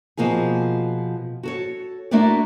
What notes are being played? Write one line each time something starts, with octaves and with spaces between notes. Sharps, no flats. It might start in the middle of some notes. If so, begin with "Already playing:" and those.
B2 F3 A#3 F4 G#4
F#4 A4 C#5
A3 A#3 D4 E4 F#4 D5